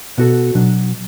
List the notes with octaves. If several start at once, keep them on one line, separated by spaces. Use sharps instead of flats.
B2 B3 F#4 A4
B2 F#3 D4